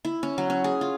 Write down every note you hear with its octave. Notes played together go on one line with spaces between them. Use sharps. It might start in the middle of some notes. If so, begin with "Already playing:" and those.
E4
C#4
F#3
C#4
G#4
F4